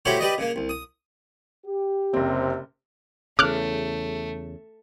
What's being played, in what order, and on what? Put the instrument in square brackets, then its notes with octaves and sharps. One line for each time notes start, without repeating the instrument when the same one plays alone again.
[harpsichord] A3 E4 F#4 G4 C5 C#5
G4 B4 D5 D#5
C#3 A#3
C2
D#6
[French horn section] G4
[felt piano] F#1 C4 [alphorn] C3
[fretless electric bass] E2 C#3 [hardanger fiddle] A3 [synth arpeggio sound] D6 F6 F#6